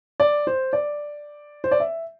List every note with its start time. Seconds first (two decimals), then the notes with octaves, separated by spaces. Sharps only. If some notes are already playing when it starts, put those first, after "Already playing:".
0.20 D5
0.47 C5
0.73 D5
1.64 C5
1.71 D5
1.80 E5